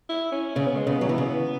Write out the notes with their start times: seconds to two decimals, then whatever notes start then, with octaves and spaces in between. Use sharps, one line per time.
0.09 E4
0.32 C#4
0.55 C#3 C#4
0.66 B3
0.76 G#3
0.87 C#3 B3
1.01 F#3
1.09 E3
1.18 C#3